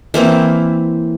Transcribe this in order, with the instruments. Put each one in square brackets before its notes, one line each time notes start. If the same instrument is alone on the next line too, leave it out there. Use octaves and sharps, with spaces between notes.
[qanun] E3 A#3 C4 E4